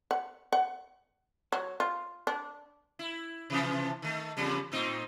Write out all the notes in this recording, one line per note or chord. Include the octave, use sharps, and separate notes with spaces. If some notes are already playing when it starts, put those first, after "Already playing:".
F#5
F#5
F#3
F4
D4
E4
C3 E3 F3
D#3 A3
E2 C#3 G3
A2 C4 D#4